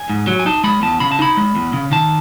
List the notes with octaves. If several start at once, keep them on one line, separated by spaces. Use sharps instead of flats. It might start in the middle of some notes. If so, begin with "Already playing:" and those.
Already playing: G#5
G#2
F#3
G#5
D#4 A5
G#3 B5
E2 A5
C#3 B5
A5
D#4 B5
G#3
E2
C#3
D#3 A5